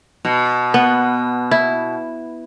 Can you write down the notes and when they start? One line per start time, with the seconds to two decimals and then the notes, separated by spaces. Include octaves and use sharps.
0.25 B2
0.74 B3
1.51 E4